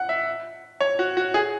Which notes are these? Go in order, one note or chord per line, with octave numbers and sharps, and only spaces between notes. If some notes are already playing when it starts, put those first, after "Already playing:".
Already playing: F#5
E5
C#5
F#4
F#4
G#4